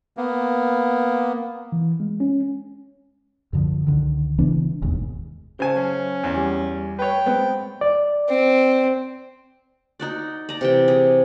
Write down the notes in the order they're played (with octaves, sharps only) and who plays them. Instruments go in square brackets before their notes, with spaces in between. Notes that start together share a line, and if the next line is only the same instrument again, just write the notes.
[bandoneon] A#3 B3
[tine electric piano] E3
G#3
C#4
[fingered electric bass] F#2 D3 F3
C#2 D3 D#3
C#3 E3 B3 D4
F1 D#2 G#2 B2
[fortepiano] C#3 G#5 [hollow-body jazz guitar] C5 A5
[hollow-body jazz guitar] F#2 C5 [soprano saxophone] C#4
[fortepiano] E2
[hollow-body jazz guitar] G3
[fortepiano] B4 C#5 [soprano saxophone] G5
[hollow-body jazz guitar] G#2 G#3 C4 [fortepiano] B3
[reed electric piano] D5
[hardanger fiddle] C4
[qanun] D#4 F#4 D5
D5 A#5
C3 E3 G5
G#4